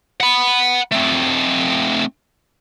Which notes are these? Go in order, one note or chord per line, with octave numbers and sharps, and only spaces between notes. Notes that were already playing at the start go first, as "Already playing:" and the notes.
F#5 B5
A3 C4